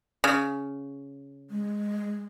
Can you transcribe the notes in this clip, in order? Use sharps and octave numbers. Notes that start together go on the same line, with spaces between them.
C#3
G#3